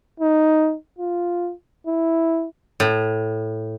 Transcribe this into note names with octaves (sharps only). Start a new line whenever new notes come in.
D#4
F4
E4
A2